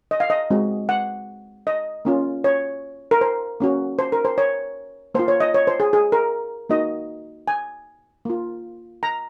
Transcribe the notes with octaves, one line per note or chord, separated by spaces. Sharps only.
D#5
F5
D#5
G#3 C4 F#4
F#5
D#5
A#3 C#4 F4
C#5
A#4
C5
A#3 C#4 F#4
C5
A#4
C5
C#5
A#3 F4 C5
C#5
D#5
C#5
C5
G#4
G#4
A#4
A#3 D#4 F#4 D#5
G#5
A#3 F4
A#5